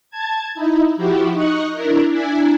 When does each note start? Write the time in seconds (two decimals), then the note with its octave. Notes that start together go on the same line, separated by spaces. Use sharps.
0.10 A5 G#6
0.55 D#4 E4
0.97 F3 E4 F#4 G4
1.33 D#4 D#5 C#6 F#6
1.73 D4 E4 A#4
2.09 D4 E4 G#5